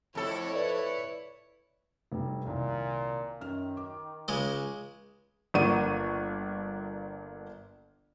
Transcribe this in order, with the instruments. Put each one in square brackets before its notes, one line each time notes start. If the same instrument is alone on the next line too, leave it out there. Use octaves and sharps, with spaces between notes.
[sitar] F2 A4 [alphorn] A2 [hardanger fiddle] E4 C#5
[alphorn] B4 [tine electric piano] D5
[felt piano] F1 G2 G3
[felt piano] C2 D#3 [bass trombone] A#2
[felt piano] F#2 F6 [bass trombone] D#3
[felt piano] D6
[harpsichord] C#2 G#3 D#5
[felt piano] G1 A#3 D4 F#5 C#6 D#7